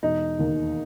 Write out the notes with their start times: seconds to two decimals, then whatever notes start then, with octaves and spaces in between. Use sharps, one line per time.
0.03 E1 D#4
0.39 D#2 D#3